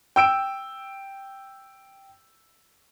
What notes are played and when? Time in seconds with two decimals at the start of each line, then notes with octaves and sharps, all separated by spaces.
0.16 G5 E6 D7